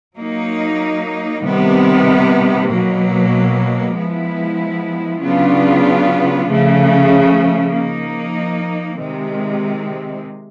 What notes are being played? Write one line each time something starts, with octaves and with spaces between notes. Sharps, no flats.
F#3 A#3 D#4
C3 D#3 G3 B3
B2 F#3 A#3
F3 G#3 B3 E4
C#3 F#3 B3 D4 F4
C#3 F3 A3
F3 A#3 D#4
C3 D#3 G#3 C4